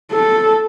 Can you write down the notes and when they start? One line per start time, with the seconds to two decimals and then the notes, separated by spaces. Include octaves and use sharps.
0.12 A4